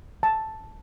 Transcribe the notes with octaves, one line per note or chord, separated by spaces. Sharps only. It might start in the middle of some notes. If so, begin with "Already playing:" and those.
A5